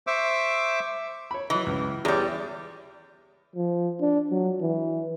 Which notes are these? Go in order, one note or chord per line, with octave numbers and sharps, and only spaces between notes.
C5 E5 C#6 D6 E6
C#5 B5
E3 F#3 D#5
C#2
E2 G3 G#4 C#5
F3
D4
F#3
E3